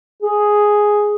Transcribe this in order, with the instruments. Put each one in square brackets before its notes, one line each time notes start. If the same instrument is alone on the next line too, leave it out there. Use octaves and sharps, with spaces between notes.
[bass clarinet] G#4